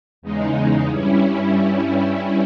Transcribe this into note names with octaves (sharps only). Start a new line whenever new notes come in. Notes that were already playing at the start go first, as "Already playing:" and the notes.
E2 C#3 G#3 D#4
G2 G3 C#4 E4